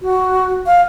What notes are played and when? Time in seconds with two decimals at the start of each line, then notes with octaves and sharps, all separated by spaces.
0.02 F#4
0.66 F5